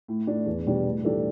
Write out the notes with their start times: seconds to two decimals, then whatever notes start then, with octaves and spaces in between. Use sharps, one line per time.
0.08 A2
0.27 A3 D4
0.46 E2
0.67 B2 G3 D4
0.86 A2
1.04 E3 G3 D4 A4